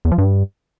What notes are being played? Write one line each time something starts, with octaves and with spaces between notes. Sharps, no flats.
E2
F3
G2